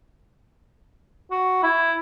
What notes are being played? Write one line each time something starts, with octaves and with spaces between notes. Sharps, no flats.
F#4
E4